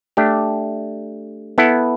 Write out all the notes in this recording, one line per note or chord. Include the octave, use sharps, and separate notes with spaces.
A3 D4 G4
B3 E4 A4